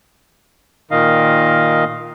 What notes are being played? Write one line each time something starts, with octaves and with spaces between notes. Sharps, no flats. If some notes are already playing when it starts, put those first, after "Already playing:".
A#2 D#3 D#5 F5